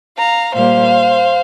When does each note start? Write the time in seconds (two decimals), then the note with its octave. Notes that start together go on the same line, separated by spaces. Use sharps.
0.17 F5 A#5
0.53 A#2 G3 A#3 C5 F5